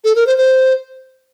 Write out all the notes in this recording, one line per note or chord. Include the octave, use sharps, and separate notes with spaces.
A4
A#4
C5
C5